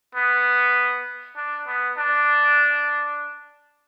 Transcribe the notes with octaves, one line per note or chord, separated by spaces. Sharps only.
B3
D4
B3
D4